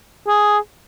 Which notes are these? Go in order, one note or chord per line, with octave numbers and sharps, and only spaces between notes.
G#4